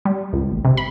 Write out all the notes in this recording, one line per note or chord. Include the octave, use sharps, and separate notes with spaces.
G3
C#2
A1
C3
B5